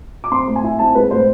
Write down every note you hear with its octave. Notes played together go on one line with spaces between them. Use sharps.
D6
C4 C6
A2
G#5
E4
C4 A5
G#3 B4
A2 C5